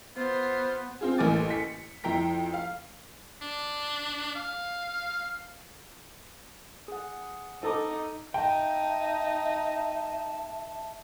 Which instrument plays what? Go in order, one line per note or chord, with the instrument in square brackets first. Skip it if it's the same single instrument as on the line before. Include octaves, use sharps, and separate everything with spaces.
[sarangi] B3 [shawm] F4 [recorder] C5
[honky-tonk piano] C4 F4 G#4
A1 A2 A#3 G#5 D6 A6
B6 C#7
F2 E4 G5 A#5 B6
F5
[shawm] D4
F5
[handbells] G#4 F#5
[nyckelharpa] D#4 [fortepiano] A4 A5 D6
[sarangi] D#4 [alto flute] E5 [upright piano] G5 [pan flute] A5